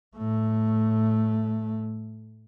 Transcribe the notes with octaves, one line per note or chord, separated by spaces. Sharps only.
A2 A3